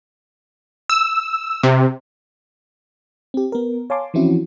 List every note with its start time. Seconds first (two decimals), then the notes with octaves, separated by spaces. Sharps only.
0.90 E6
1.63 C3
3.34 C4 G4
3.52 B3 A#4
3.90 C#5 F5 G#5 A5 C6 D6
4.14 E3 F3 C4 C#4 E4 F#4